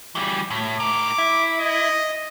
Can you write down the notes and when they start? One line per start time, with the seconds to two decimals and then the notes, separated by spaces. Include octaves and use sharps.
0.15 E3 G3
0.50 A2
0.80 A2 A#4 D6
1.18 E4
1.59 D#5